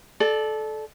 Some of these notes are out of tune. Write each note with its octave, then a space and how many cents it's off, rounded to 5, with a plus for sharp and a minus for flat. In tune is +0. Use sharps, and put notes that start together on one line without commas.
A4 -20 D5 +15